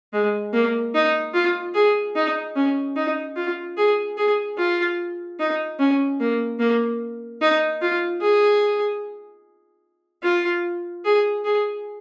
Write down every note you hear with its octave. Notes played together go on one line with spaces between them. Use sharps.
G#3
A#3
D#4
F4
G#4
D#4
C#4
D#4
F4
G#4
G#4
F4
D#4
C#4
A#3
A#3
D#4
F4
G#4
F4
G#4
G#4